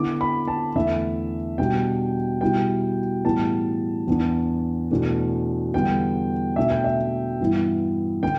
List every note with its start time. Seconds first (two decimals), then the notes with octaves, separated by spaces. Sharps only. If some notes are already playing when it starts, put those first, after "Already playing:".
Already playing: D3 B3 E4 D6
0.21 B5
0.48 A5
0.75 E2 D3 A3 E5
1.58 B2 G3 D4 G5
2.41 B2 G3 E4 G5
3.25 A2 E3 G3 B3 A5
4.07 E2 E3 B3 D4
4.91 E2 B2 A3 D4
5.74 E2 D3 G3 B3 G5
6.56 B2 A3 D4 E5
6.70 G5
6.84 E5
7.40 G2 E3 B3 E4
8.23 D3 G5